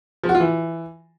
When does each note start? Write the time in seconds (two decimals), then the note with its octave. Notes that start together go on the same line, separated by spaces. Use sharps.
0.23 F3
0.29 F#4
0.34 F4
0.40 E3